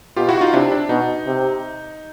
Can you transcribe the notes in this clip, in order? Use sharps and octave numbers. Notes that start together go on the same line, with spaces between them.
B2 F4 G4
E4 F#4
D#4 F4
C3 D4 E4
D4
B2 D#4
C3